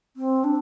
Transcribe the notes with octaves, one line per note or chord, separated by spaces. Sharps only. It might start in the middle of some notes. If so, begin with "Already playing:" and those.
C4
D4